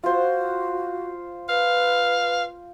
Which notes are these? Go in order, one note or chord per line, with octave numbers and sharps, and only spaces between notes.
F4 F#4 C5
B4 F5